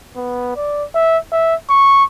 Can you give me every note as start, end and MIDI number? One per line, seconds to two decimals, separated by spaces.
0.16 0.55 59
0.56 0.84 74
0.95 1.18 76
1.32 1.55 76
1.70 2.04 85